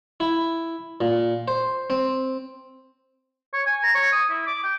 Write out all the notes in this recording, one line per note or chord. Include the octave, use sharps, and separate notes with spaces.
E4
A#2
C5
C4
C#5
G#5
A#5
C#5
D#6
E4
D6
G5